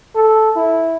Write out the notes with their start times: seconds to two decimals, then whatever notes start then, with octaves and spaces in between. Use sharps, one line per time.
0.16 A4
0.57 E4